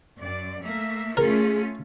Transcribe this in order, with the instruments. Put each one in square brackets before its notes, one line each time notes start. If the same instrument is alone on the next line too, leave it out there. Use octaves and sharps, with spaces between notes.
[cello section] F#2 D5
A3 A#3 E5
[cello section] A3 C#4 F4 [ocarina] G#4 [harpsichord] A#4